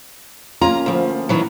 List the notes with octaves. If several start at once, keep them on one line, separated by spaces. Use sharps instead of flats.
A#3 C#4 F4 A#5
D2 F3
D#3 E3 F#3